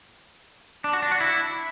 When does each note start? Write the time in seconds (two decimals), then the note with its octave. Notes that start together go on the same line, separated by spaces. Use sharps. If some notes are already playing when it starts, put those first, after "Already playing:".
0.84 D4
0.93 F#4
1.02 D4
1.11 F#4
1.21 E4